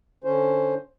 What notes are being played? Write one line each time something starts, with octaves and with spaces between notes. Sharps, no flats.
D3 C#4 C5